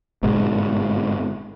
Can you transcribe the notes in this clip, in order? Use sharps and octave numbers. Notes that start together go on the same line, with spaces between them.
G1 G#2 B2 G#3